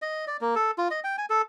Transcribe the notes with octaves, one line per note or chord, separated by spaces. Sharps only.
D#5
D5
A#3
A4
F4
D#5
G5
G#5
A4